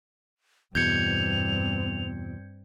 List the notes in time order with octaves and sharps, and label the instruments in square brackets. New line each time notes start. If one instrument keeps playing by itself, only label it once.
[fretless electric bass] E2 B2 [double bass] G2 C4 [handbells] G6 G#6 C#7 [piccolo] F7